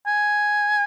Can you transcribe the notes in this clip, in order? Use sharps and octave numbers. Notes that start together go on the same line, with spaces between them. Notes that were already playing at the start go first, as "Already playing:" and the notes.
G#5